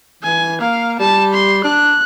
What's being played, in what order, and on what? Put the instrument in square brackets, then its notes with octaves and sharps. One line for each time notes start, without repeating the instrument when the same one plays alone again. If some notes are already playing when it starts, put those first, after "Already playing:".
[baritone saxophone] E3 [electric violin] G#5
[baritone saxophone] A#3 [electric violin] F5
[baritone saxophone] G3 [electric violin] A5
[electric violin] C6
[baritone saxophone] D4 [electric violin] F#6